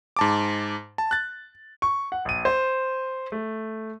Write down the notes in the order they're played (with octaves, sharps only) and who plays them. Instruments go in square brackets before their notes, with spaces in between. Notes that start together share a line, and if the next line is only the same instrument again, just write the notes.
[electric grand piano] G#2 A5 D6
A5
F#6 A6
[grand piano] C#6
F#5
A#1 D#7
C5
A3